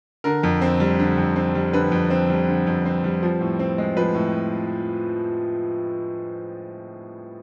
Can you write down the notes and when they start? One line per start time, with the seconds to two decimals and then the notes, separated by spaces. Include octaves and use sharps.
0.24 D3 A#4
0.43 F2
0.61 C4
0.80 G3
0.99 D3
1.18 F2
1.36 C4
1.55 G3
1.73 D3 B4
1.92 F2
2.10 C4
2.30 G3
2.47 D3
2.67 F2
2.85 C4
3.04 G3
3.23 F3
3.41 A2
3.59 C4
3.78 G#3
3.97 F3 B4
4.15 A2